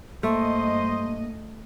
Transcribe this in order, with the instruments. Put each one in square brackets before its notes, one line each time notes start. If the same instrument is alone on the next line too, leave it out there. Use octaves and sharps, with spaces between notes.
[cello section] G2 D#5 [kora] A3 [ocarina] A#3 [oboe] C5